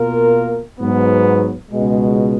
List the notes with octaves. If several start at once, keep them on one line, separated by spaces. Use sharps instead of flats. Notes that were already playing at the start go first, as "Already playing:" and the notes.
Already playing: B2 A#3 F4 A#4
G#2 F#3 B3
C#2 B2 G#3